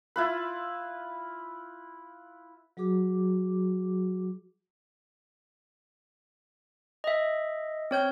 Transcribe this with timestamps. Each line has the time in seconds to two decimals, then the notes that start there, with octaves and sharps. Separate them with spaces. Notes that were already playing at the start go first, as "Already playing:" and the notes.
0.16 E4 F4 B4
2.77 F#3 F#4 G#4 D6
7.04 D#5 E5
7.91 C4 C#5 G6